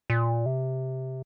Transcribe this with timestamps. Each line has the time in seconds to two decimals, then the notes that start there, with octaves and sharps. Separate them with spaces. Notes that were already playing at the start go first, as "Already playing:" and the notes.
0.10 A#2
0.46 C3